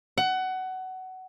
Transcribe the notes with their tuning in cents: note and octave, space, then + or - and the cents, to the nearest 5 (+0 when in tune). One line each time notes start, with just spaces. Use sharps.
F#5 +20